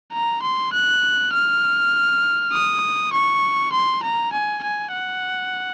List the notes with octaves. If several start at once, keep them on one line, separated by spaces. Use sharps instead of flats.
A#5
C6
F#6
F6
D#6
C#6
C6
A#5
G#5
G#5
F#5